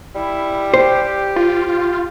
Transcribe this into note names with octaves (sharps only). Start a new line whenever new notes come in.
G3 E4
G4 C5
F4